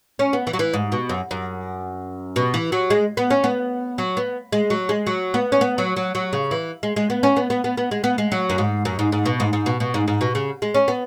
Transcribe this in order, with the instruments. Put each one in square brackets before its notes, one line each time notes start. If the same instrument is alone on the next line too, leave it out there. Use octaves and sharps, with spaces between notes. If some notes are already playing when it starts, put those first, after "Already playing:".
[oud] C#4
B3
E3
F#3
E3
G#2
B2
F#2
F#2
B2
E3
F#3
G#3
B3
C#4
B3
F#3
B3
G#3
F#3
G#3
F#3
B3
C#4
B3
F#3
F#3
F#3
C#3
E3
G#3
G#3
B3
C#4
B3
B3
B3
B3
G#3
B3
G#3
F#3
F#2
G#2
F#2
G#2
G#2
B2
G#2
G#2
B2
B2
G#2
G#2
B2
C#3
G#3
C#4
B3